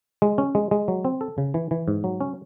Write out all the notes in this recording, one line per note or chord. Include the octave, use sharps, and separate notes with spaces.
G#3
C#4
G#3
G#3
F#3
C4
A4
C#3
E3
E3
G#2
F#3
C#4